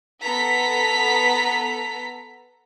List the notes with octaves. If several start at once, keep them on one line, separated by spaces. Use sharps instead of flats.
B3 A4 A#5 B6